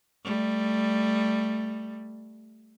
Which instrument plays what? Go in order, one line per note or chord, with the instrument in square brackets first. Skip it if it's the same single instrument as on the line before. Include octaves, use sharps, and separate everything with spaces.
[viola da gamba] G3 A3